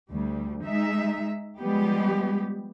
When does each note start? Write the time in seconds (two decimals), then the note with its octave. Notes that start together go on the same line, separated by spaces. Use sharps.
0.11 D2 G3
0.64 G#3 D#4 E5
1.59 F3 G3 G#3 B3 G4